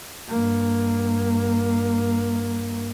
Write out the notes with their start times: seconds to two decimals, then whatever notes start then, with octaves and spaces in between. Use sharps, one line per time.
0.28 G2 A#3